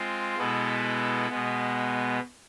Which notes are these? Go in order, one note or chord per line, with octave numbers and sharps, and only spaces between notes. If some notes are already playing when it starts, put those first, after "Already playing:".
Already playing: G#3 C4 F4
B2 G#3 B3 E4 A4
B2 G#3 B3